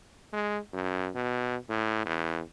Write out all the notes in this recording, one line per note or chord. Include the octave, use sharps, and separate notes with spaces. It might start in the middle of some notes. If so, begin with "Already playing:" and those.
G#3
F#2
B2
A2
E2